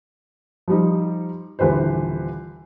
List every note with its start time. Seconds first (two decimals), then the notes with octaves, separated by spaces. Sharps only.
0.68 F3 G3 D#4
1.59 D#1 D3 E3 B4 C5